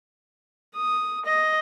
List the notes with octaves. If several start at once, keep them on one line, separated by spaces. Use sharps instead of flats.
D#6
D#5